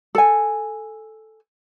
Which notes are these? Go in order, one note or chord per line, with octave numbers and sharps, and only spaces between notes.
A4 G#5